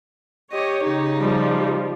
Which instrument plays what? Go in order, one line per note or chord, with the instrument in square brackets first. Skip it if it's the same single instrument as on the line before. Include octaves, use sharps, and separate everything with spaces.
[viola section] G4 C#5 [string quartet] D#5
[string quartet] C#3 D#4
[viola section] F3 G3